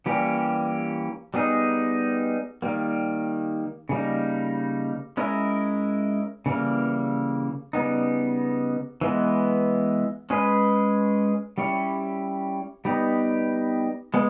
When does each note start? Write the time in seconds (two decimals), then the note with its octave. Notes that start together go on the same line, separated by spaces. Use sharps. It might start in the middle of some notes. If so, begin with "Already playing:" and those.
0.06 E3 G3 A#3 C#4 G4
1.34 G3 B3 D#4 G#4
2.62 D#3 G3 A#3
3.89 C#3 G3 A#3 D#4
5.17 G#3 C#4 E4 A#4
6.46 C#3 E3 G3 A#3
7.73 C#3 G3 B3 D#4
9.01 E3 G#3 B3
10.30 G#3 C#4 G#4 B4
11.58 G3 C#4 E4 G4 C#5
12.85 G3 B3 D#4 G4
14.14 G#3 B3